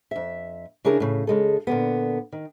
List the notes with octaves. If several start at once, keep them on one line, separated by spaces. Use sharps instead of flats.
F2 E5
C#3 D4 E4 G#4 A#4
A2 C#3
C#3 G#3 A4
A#2 D3 B3
D#3